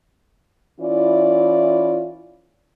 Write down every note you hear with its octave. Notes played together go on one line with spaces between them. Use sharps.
E3 C#4 E4 F4 D5